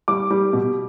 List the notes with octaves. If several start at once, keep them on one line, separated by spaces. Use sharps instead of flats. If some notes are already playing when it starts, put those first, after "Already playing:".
G3 D6
G3
B2